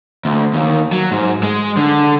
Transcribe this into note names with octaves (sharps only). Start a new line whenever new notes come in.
D2
D#2
F#3
G#2
G#3
D3